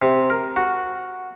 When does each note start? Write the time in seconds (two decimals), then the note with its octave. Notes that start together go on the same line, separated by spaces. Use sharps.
0.02 C3
0.30 A#4
0.56 F#4